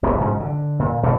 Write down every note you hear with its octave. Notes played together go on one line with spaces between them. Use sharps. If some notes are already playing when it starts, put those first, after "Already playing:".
D1 A#1 G#2 B3
G#2 C#3 F#3
D3
A#2
D2 B2